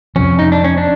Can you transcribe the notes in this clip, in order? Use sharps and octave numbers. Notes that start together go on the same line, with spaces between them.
F2 C3 F3 C#4
D#4
D4
C#4
D4